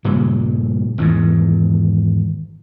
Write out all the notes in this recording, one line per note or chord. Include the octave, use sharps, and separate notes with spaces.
G2 A#2 C#3 G3
G#1 E2 G#2